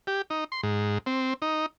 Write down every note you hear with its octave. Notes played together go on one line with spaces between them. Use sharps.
G4
D#4
C6
G#2
C4
D#4